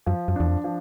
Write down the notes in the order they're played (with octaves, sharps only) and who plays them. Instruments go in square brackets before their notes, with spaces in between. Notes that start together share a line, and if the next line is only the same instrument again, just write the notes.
[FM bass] F#2 [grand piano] F3
[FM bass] F#2
[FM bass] E2 [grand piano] D4
[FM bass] F2
[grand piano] F3